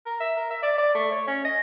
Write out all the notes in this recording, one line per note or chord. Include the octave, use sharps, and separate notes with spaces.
A#4
E5
A#4
E5
D5
D5
A3
C#5
C#4
D#5